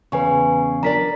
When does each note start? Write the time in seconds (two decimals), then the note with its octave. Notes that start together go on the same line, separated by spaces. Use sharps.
0.12 E2 C#3 B4 G#5 C#6
0.83 D4 A#4 D5 A#5 B6